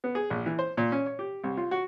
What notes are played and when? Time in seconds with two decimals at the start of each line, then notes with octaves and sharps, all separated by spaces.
0.04 B3
0.15 G#4
0.30 A#1
0.46 E3
0.59 C5
0.77 A#2
0.92 C#4
1.06 C#5
1.19 G4
1.43 C2
1.57 F4
1.71 F#4